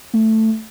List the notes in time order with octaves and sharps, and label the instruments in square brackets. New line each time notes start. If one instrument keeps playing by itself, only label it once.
[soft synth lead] A3